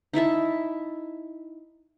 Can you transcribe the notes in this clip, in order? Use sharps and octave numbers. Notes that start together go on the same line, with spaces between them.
D#4 E4 E5 A5